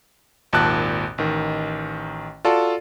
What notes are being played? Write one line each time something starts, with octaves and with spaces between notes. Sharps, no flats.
G#1 D#2 A#2 A5 F#6
A1 D#3
F4 F#4 A4 D5 A5